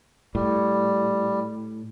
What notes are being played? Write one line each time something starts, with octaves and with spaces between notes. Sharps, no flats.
A2 G3